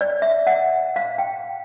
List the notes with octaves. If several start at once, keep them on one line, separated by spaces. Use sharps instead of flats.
D5
E5
F#5
F5
G5